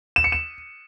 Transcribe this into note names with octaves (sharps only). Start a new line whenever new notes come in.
E7
C#7
E7